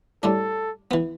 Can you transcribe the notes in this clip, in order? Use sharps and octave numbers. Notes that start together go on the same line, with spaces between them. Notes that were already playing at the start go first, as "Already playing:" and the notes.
A2 G3 D4 A4
E3 B3